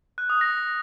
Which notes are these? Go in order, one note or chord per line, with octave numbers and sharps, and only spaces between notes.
F#6
D#6
A#6